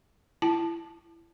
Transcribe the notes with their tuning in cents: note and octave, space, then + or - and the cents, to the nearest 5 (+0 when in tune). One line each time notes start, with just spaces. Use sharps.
E4 +30 A5 -5